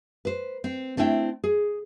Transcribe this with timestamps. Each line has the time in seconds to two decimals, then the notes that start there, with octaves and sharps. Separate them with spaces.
0.25 B4 C5
0.64 C4
0.97 A3 C4 D4 E4 G5
1.44 G#4